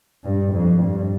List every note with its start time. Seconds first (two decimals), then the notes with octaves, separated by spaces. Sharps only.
0.24 G2
0.53 F2
0.82 G2